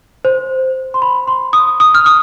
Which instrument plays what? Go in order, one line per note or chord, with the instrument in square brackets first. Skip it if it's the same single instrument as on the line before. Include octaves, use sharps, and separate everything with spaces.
[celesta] C5
C6
B5
C6
D#6
D#6
F6
D#6